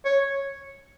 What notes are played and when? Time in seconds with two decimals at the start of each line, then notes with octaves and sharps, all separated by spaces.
0.05 C#5